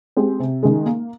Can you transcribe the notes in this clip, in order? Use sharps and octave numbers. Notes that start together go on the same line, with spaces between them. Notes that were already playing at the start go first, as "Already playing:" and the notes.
G#3 C4 G4
C3
D#3 G#3
A#3